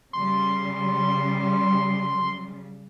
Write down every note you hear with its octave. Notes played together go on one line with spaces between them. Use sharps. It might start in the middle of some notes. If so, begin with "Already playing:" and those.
C#3 G3 C6